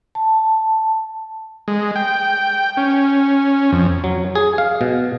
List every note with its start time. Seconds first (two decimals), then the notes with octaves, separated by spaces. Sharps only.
0.15 A5
1.68 G#3
1.96 G5
2.77 C#4
3.72 F2
4.04 F#3
4.35 G#4
4.58 F5
4.81 B2